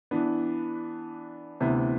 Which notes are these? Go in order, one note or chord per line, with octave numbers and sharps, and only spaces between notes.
E3 B3 D4
D2 C3 E3 B3